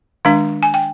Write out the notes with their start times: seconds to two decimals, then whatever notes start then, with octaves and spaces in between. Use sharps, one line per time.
0.25 D#3 G#3 D4 F5
0.63 G#5
0.74 G5